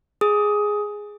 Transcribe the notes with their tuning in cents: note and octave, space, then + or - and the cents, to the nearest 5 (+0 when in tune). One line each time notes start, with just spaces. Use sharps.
G#4 +0 D#6 +15